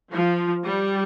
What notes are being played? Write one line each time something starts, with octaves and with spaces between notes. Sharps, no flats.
F3
G3